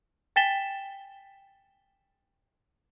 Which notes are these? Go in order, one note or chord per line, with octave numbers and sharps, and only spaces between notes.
G5 G#5 A6 B6 E7 G7